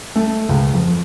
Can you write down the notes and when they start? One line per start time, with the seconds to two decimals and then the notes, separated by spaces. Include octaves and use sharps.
0.16 A3
0.49 C#2
0.74 F2